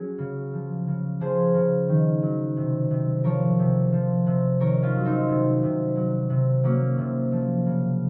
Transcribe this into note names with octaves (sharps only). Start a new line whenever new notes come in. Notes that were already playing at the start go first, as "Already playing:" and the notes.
Already playing: F#3 C#4 G#4
C#3
F3
C#3
F3 G#4 C5
C#3
D#3
F#3
C3
C3
F3 A#4 C#5
C3
F3
C3
D#3 A#4 C#5
C#4 F4
F#3
C4 D#4
C3
C3
F#3
C3
F#3 A#3 C#4
C3
F3
C#3